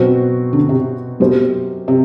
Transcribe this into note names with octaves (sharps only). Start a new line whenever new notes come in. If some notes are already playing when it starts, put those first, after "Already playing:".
Already playing: B2 F#3 C4 F#4
D3
C3
F#2 B2 F#3 C4 G4 C5
C3